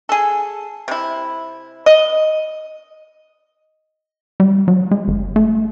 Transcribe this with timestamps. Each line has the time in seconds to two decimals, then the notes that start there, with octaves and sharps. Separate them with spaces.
0.09 G#4 A4
0.88 C3 E4
1.86 D#5
4.40 G3
4.68 F#3
4.91 G#3
5.08 G1
5.36 A3